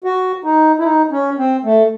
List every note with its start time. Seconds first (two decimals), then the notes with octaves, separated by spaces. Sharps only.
0.04 F#4
0.44 D#4
0.79 E4
0.84 D#4
1.11 C#4
1.38 C4
1.65 A3